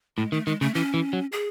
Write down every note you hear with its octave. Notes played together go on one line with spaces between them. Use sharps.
A2 G#3
D#3 A3
D#3 G#3
C#3 A3
E3 C#4
E3
F#3
G#4